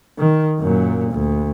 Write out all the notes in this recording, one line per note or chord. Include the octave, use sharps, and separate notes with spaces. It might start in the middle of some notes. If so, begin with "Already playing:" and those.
D#3
F#2 A#2
D2